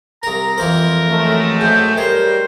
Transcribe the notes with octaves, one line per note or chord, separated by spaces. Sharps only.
C2 A#4 A#5
F2 E3 A#4 C5
F#2 G#3 A3
G#2 G5
G3 A#4 C5 C#5